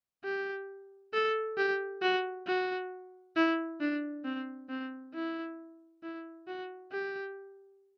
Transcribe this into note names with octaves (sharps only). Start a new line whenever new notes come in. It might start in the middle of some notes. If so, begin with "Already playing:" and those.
G4
A4
G4
F#4
F#4
E4
D4
C4
C4
E4
E4
F#4
G4